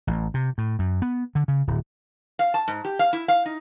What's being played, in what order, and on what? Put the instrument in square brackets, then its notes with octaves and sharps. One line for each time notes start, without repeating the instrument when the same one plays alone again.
[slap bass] A1
C3
A2
F#2
B3
D3
C#3
D1
[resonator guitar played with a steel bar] F5
A5
G#2
G4
F5
E4
F5
D#4